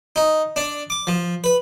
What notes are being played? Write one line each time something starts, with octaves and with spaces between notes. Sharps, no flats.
D#4
D4
D6
F3
B4